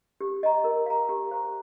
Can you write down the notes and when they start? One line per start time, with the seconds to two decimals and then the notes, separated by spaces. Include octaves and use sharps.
0.21 G4
0.43 D#5 A#5
0.64 A#4
0.86 F5 A#5
1.09 G4
1.31 C5 F5 A#5